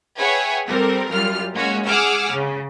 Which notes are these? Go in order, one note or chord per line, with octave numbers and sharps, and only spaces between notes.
G#4 B4 C#5 E5 F#5 G5
G3 C4 A4 A#4
F#2 G3 F4 F6
G#3 A#3 C#4 F#4 C#5
G#4 F#5 G#5 D6 E6 F6
C#3